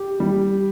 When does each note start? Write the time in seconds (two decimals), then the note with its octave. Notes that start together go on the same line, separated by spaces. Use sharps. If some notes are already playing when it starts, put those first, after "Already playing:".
Already playing: G4
0.20 G3